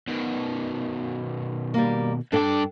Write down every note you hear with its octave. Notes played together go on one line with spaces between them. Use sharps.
B2 D#3
G3 A#3
G2 D4 A4 D5 G5